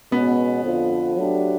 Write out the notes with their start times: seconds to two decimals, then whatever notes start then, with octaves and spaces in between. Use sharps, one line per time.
0.12 B2 G#3 B3 C#4
0.64 F2 D3 F3
1.15 F#3 A3 D4 G4